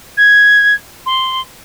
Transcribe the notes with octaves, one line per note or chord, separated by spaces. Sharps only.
G#6
C6